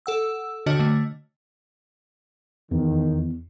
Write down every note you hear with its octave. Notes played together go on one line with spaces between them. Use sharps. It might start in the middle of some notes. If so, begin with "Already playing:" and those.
A4 F#5 E6
D3 D4 F#4 C#5 D#5 F6
D3 A3
E2 D#3